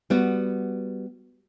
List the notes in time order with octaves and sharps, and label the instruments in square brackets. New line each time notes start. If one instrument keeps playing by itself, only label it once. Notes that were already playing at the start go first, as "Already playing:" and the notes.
[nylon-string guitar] G3 B3 F#4